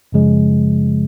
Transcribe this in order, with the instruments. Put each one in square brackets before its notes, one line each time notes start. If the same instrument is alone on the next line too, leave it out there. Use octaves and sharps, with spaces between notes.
[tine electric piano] F#2 C#3 F3 G#3